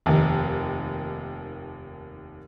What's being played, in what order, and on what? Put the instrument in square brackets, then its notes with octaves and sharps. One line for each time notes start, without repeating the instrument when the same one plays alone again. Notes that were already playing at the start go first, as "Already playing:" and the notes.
[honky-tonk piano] F1 D#2